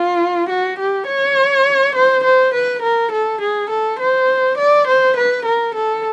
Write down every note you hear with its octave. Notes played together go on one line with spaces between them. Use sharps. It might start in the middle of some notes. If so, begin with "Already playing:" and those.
Already playing: F4
F#4
G4
C#5
C5
C5
B4
A#4
A4
G#4
A4
C5
D5
C5
B4
A#4
A4